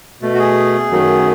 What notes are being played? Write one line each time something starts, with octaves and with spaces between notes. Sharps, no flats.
B2 A3
F#4
G#4
F#2 D#3 F#3 A3